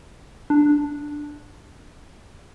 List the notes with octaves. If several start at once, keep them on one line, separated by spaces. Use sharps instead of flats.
D4